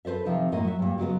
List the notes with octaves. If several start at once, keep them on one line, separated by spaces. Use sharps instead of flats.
A4 B4 C5 D5 E5
C3 D#3 F3 C4 D#4
F#2 A2 A#3 D#5
F#3 E5
G2 A#2
C#3 F#3 G#3 B3